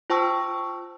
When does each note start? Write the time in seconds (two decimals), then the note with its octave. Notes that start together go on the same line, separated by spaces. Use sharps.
0.10 F4 C5 G5 A5 C#6 E6